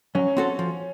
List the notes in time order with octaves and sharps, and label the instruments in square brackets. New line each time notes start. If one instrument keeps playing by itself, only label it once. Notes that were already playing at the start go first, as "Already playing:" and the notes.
[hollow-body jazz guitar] F#3 [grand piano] C#4
[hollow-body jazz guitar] C4 F#4 A4
F3